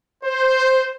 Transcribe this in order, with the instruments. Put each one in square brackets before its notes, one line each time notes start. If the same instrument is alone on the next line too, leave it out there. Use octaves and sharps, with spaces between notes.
[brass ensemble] C5